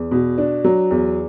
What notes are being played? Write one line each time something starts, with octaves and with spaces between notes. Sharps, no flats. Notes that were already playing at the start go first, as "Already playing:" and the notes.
Already playing: E2
B2
D4
F#3
E2